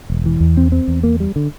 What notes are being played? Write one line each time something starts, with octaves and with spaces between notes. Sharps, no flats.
E1
E3
E2
C4
C4
E2
A#3
G3
D3